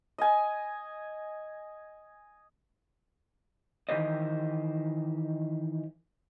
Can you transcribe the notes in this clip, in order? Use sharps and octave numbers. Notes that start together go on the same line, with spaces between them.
D#5 G#5
D#3 E3 G4 A#4 C5 D#5